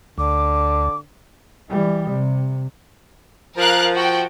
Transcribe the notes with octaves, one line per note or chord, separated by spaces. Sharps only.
D2 D3 D6
E3 G3
C3
F3 A#4 F5 F#6
F#4 G5